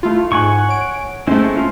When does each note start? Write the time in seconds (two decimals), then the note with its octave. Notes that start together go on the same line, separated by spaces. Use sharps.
0.03 A3 E4 F4
0.32 G#2 F#5 G#5 C#6
0.69 C#5 D7
1.27 G#3 A3 C4 C#4 E4 C5
1.56 C#4 F4